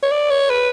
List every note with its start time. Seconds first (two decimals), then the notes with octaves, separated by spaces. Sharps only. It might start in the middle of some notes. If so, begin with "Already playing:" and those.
0.03 C#5
0.11 D5
0.30 C#5
0.50 B4